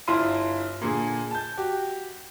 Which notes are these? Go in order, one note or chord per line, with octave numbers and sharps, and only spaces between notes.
G1 E4 F4 F5 C6 D#7
A#2 D3 G#4
A5 G6
F#4 G4